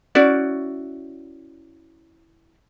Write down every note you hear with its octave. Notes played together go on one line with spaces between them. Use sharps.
C#4 E4 F#4 D5